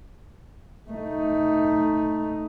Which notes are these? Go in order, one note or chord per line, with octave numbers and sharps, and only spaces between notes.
A3 D#4